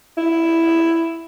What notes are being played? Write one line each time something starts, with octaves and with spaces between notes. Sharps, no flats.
E4